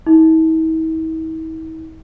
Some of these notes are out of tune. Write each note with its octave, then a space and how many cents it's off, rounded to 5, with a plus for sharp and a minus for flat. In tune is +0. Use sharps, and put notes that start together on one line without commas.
E4 -45